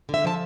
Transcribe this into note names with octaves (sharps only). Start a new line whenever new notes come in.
D3 E5
F3 A5